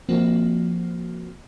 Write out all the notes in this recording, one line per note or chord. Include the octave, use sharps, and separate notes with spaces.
F3 A#3 C4 F#4